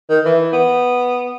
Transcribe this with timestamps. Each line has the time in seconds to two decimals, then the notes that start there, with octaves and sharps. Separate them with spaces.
0.09 D#3
0.25 E3
0.52 B3